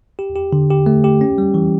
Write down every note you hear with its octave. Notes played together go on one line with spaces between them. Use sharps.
G4
G4
D3
G4
A3
G4
C#4
G3
E3